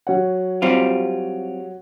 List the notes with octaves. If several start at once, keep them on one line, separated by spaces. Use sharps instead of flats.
F#3 C#5 F#5
G3 C4 F4